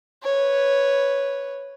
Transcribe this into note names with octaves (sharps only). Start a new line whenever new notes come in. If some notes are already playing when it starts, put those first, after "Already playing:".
B4 C#5